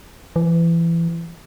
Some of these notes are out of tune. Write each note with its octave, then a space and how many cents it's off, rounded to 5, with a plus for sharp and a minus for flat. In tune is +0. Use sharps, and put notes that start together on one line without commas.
E3 +25